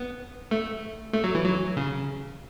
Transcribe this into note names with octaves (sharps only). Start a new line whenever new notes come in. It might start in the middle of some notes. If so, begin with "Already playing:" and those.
Already playing: B3
A3
A3
F#3
E3
F#3
C#3